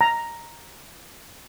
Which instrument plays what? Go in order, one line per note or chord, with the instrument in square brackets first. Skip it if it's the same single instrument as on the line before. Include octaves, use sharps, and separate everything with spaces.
[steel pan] A#5